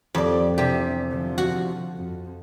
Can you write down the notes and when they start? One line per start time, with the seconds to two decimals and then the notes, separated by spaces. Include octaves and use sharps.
0.15 F2 F3 G4 D5
0.58 E2 C3 D4 G4
1.07 D3 F3
1.38 F#4
1.96 F2